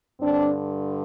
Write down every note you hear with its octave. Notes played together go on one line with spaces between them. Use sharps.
G2 D3 C4 D4